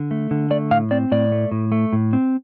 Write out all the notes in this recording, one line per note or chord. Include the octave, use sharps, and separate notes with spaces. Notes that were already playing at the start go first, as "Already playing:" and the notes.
Already playing: D3
A3
D3
A3 D5
A2 F5
C4 D5
A2 D5
A3
A2
A3
A2
C4